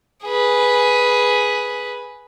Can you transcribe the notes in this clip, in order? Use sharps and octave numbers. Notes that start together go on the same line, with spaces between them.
G#4 B4